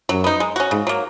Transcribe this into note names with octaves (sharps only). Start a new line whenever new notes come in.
F#2 F#3
B3 D#4
G#3
C#4 F#4
G#2 C#3
F#3 A#3